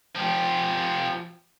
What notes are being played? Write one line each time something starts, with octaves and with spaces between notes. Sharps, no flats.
F3 G4